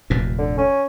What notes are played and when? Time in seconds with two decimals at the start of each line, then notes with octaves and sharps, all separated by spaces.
0.10 F1 D#2 A#2
0.39 D3
0.58 C#4